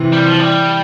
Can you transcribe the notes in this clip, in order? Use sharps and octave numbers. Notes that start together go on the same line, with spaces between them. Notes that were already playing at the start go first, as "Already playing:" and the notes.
Already playing: C3 E3
G3
F3
G3